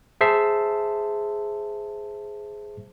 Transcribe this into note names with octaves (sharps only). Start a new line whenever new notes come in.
G#4 C5 E5 A5 C7